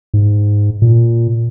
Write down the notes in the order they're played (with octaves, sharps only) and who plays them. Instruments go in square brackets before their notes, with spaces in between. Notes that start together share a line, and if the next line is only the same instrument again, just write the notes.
[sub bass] G#2
A#2